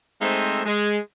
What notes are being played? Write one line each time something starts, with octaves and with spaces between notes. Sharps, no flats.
G#3 A3 C4 D#4 C5 E5
G#3